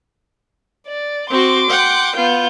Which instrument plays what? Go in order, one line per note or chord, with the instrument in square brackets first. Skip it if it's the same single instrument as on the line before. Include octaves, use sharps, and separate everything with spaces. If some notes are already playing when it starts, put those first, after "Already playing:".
[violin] D5
[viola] C4 F#4 [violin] C6 D6
[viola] F#5 G5
[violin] B3 G6 [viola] F4